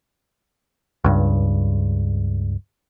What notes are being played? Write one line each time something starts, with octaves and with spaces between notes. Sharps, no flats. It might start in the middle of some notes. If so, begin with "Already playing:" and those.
C#2 G2